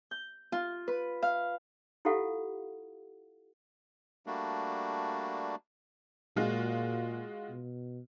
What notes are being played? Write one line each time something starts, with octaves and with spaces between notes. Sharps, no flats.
G6
F4
B4
F5
E4 F4 G4 A4 F5 F#5
G3 A3 A#3 D4 F#4
A#2 G#3 F4 F#4
B2